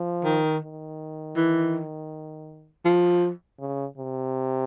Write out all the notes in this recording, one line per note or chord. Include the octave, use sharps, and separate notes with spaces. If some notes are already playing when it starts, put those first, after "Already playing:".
Already playing: F3
D#3
D#3
E3
F3
C#3
C3